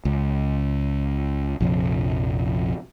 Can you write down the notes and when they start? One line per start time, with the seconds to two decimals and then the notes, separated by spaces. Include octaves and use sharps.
0.05 C#2
1.61 A#1 F2 C3